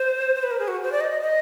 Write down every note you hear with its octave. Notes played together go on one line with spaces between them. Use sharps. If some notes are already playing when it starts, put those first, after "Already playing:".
Already playing: C5
C5
B4
A#4
G#4
F#4
C5
D5
D#5
D#5
D#5